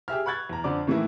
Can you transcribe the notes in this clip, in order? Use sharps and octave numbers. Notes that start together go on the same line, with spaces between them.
G4 G#4 E5 F6
B5 C#6 F#6 G#6 A6
E2 A#5
F2 D3 C5 D5 D6
A2 D#3 E3 A3 A#3 E4